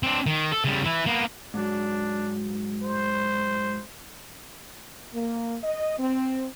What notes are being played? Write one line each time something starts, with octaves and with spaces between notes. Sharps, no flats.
C4 D4
D#3
A4
C#3 G3
E3 E4
A#3 B3
G#2 F#3 D4
C5
A#3
D#5
C4